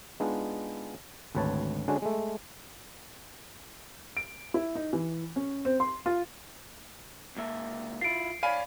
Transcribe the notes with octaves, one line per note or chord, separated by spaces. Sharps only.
G#3 B3 D4 D#4 F4
G#1 D2 B4 C#5 A5
D3 G#3 C#4 D4 F#4
G#3 A3
D7
E4
D#4
E3
C#4
C4
C6
F4
C#2 A#3 E5
E4 F4 C7 D7
C#5 D5 F5 G#5 B5 D#7